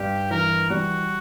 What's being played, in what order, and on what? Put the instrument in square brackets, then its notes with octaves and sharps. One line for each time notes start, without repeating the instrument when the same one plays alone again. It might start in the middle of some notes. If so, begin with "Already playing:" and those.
Already playing: [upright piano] G2 [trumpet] G4
[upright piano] E3 [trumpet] A#4
[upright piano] G3 [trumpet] F#4